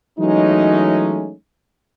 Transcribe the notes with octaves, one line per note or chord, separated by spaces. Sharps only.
E3 F#3 G#3 A3 C#4 D#4